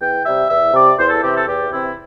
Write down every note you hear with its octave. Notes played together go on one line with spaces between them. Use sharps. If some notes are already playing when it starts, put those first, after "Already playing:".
E2 G5
C3 G3 E5
E2 E5
C3 G3 D5
E2 C5
A4
C3 E3 C4 G4
A4
E2 G4
C3 E3 C4 E4